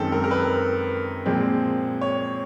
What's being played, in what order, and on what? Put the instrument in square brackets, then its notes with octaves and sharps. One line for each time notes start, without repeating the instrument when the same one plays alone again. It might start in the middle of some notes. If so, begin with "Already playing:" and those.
Already playing: [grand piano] F#2 D#3 G#3 C4 A4
A#4
A#4
B4
A#2 F3 G#3 C4
C#5